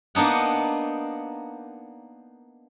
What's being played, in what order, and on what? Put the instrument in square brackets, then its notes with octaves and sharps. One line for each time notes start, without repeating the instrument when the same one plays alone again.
[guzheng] A#3 B3 D4 D#4 F#5